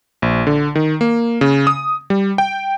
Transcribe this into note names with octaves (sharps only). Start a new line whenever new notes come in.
A#1
D3
D#3
A#3
C#3
D#6
G3
G5